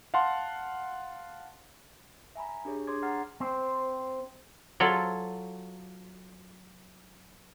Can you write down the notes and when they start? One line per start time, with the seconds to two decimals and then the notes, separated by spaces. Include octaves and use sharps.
0.14 F5 F#5 A5 C6
2.35 E5 G#5 A#5 B5
2.65 D4 G4 G#4 C#5
2.87 D4 G#4 C#5 C6 D6 G#6
3.02 G#4 F#5 A#5 F6 A6 C7
3.40 C4 C5
4.80 F#3 F4 A4